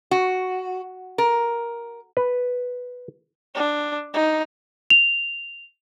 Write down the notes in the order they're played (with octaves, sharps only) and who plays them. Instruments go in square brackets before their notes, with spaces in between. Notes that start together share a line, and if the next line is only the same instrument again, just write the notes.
[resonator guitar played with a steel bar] F#4
A#4
[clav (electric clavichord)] B4
[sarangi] D4
D#4
[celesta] F7